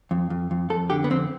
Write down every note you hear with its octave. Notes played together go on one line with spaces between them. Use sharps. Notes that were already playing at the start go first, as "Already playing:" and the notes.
F2
F2
F2
F2 A4
D3 G4
B3
F2 C4